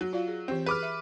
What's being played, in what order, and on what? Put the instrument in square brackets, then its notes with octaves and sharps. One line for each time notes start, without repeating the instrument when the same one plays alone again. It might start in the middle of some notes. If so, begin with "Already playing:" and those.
[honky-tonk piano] F#3
[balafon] F4 D5 F5
G#4
[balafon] E3 G4 D5 [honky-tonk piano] C4
[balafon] G#4 [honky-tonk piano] B4 D6 F6
[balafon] E5